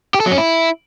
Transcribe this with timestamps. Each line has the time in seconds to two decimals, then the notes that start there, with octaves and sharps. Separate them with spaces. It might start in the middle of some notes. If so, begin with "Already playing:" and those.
0.14 G4
0.20 A4
0.26 F#3
0.32 C#4
0.38 E4